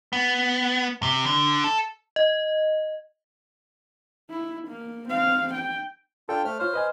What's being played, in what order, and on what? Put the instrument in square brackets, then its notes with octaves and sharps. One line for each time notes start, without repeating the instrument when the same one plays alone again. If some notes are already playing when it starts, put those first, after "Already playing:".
[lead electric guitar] B3
C3
D3
A4
[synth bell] D#5
[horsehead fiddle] E4
A#3
C4 F5
G5
[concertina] D4 F4 G5 [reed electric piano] A4
[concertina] A3 F6 [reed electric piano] C5
[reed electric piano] F4 C#5 [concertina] C5 [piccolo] F6
[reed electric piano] B4 D#5 G#5